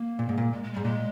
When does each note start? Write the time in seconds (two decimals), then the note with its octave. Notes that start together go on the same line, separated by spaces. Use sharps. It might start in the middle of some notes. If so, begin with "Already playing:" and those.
Already playing: A#3
0.19 A#2
0.29 G#2
0.38 A#2
0.53 G#3
0.63 G#3
0.73 G#2 G3
0.84 A#2 G#3